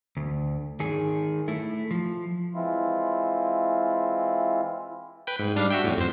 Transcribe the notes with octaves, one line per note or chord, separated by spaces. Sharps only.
D2
D#3 G#4
A3 E4
F3
E3 G#3 C4 E4 F4
B4 G5
G#2
G3 D4 F5
F#4 E5 G5
F2 A2
F2 C5